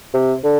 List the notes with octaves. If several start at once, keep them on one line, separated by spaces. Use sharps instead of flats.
C3
D3